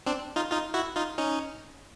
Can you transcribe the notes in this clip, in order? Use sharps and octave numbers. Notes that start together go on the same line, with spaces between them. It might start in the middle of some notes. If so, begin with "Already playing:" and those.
C4 D4
D#4 F4
D#4 F4
E4 F#4
D#4 F4
C#4 D#4